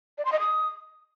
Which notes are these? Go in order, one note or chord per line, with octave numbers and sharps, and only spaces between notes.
D5
C6
D#5
D#6